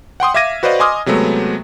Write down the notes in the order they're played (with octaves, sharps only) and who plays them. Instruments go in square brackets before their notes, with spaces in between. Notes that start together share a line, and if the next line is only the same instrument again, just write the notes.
[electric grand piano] F#5 G5 C6 D#6
E5 F5 D6 G#6 A#6 D#7
F#4 B4 C5 D5 D#5 F5
D#5 G#5 C6 D6 D#6 F6
C3 F#3 G#3 A3 B3